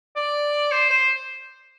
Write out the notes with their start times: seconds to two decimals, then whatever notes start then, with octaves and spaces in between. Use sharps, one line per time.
0.16 D5
0.71 C5
0.90 C5